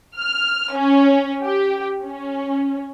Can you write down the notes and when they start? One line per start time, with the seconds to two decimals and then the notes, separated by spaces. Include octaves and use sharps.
0.17 F6
0.73 C#4
1.43 G4
2.05 C#4